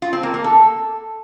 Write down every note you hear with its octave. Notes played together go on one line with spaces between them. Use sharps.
F4
C4
A#3
A#3
A4